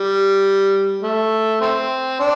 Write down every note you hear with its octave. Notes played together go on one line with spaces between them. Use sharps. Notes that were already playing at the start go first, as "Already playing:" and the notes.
Already playing: G3
A3
A3 C4
D4